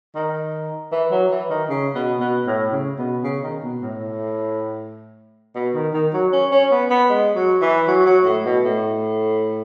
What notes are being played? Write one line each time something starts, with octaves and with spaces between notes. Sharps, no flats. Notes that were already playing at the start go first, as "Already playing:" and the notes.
D#3
E3
F#3
E3
D#3
C#3
B2
B2
A2
C#3
B2
C#3
D#3
B2
A2
B2
D#3
D#3
F#3
C#4
C#4
B3
B3
G#3
F#3
E3
F#3
F#3
A2
B2
A2